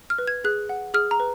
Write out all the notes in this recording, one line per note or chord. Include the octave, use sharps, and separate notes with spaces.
F6
B4
G#6
G#4 F#6
F#5
G#4 F6
A#5
B4